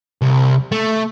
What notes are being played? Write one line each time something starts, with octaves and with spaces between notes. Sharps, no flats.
C2
A3